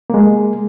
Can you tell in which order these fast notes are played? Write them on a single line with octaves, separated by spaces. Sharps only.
A#3 G#3 G#4